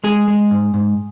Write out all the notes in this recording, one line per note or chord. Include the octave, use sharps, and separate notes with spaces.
G#3 G#4
G#3
G#2
G#2